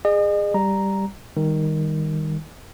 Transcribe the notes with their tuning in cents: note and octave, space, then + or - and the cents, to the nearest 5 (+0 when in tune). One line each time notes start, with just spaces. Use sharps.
G#4 -15 D#5 -40
G3 +0 A#5 +0
D#3 +0 G3 +30